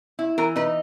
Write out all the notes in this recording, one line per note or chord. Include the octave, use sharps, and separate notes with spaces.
E4
E3 A#4
D#4 B4